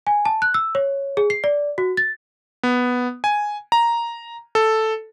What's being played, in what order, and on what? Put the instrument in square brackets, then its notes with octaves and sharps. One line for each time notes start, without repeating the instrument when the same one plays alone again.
[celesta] G#5
A5
F#6
E6
C#5
G#4
C7
D5
F#4
A6
[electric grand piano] B3
G#5
A#5
A4